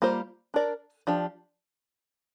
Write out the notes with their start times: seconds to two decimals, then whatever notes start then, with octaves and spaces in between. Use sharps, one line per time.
0.02 G3 A#3 F4 C5
0.54 D4 A#4 D5
1.07 F3 D4 G4